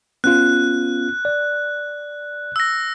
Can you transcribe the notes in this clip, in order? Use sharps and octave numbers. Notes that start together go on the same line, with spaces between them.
B3 C#4 F4 F#6
D5
E6 A#6